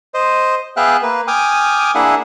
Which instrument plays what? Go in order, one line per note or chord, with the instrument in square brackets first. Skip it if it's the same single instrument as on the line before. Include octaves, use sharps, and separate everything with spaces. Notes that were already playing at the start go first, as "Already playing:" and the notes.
[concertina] C5 D#5
B3 G#4 E5 F5 G5 F#6
A#3 B4
G5 G#5 D6 D#6 F6
A#3 D4 E4 G#4 E5 F#5